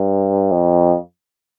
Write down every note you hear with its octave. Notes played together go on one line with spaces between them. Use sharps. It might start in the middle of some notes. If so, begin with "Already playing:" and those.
Already playing: G2
F2